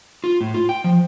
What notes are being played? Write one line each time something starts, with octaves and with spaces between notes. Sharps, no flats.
F4
A2
F4
G5
F3